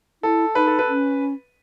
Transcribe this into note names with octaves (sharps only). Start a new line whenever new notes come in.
E4 A4
D#4 B4
A4
B4
C#4